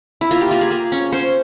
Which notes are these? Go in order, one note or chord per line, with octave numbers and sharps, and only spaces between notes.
E4
A#3 F4
G4
A#3 F4
G#4
A#3
C#4
C#4 C5